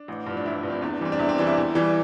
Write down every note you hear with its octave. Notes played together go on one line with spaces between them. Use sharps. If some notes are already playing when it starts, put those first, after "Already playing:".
Already playing: D4
A1
G2 F3
D4
A1 E4
G2 F3
C4
E2 D4
E3 G3 C4
D4
E2 E4
C4
E3 G3 D4
E4
E2
E3 G3